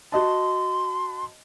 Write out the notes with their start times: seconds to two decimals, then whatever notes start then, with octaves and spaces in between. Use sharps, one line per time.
0.12 F#4 D#5 A5 C6